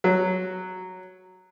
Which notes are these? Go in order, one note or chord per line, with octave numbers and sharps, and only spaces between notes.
F#3